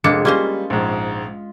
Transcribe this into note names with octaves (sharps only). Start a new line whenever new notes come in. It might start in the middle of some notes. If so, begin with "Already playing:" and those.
F1 G#3 A#3 D4 A4 C#7
G3 A#3 C#4 F4 C5 G7
A#1 G#2